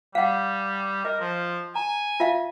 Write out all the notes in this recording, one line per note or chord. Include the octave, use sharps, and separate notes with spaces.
G3 F5 F#5
A#4 D#5
F3
G#5 A#5
F4 E5 F5